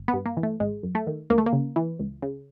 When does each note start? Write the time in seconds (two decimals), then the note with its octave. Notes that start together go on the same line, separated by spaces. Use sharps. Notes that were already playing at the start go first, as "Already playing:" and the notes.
Already playing: G1
0.08 B3
0.14 G2
0.26 A#3
0.37 E3
0.43 A3
0.60 G#1 G#3
0.83 F#2
0.95 A3
1.07 D#3
1.30 D2 A#3
1.38 A3
1.46 A#3
1.53 C#3
1.76 E3
1.99 C#2
2.22 C#3